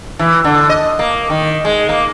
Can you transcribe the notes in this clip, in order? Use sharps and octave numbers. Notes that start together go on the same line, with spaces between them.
E3
D3
D#5
A#3
D#3
G#3
A#3